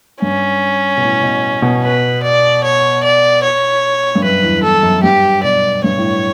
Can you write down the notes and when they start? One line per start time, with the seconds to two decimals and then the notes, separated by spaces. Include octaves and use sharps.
0.22 G2 C#4
0.97 B2
1.03 A2
1.23 B2
1.62 B2
1.83 B4
2.23 D5
2.63 C#5
3.03 D5
3.43 C#5
4.15 G2
4.24 F#2 B4
4.43 E2
4.63 E2 A4
4.83 F#2
5.03 G2 G4
5.43 B2 D5
5.84 G2 C#5
5.97 A2